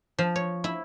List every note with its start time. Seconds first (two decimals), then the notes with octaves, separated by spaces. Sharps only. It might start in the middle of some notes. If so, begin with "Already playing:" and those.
0.19 F3
0.36 C#5
0.64 E4